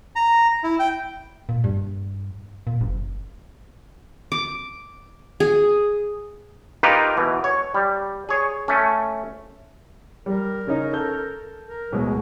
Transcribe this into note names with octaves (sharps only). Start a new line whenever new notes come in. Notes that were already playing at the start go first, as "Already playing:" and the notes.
A#5
E4
G5
A#2
G2
A#2
F#1
D6
G#4
A#3 D#4 F4 G4 A#4 B4
B2 E3
C#5
G3
G#4 C#5
A3 C#4
G3 A#4
C#3 C#4 D#4
A4 G6
A#4
D1 B2 F#3 G#3